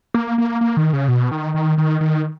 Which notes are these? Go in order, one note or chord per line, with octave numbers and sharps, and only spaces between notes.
A#3
A#3
A#3
D#3
C#3
B2
D#3
D#3
D#3
D#3